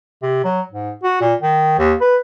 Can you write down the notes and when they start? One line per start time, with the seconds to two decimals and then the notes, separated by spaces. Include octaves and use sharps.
0.23 C3
0.44 F#3
0.71 G#2
1.03 F#4
1.21 A#2
1.42 D#3
1.79 D#2
2.01 B4